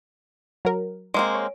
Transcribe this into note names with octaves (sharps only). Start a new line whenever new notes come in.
F#3 A#4
G#3 A#3 C4
C#5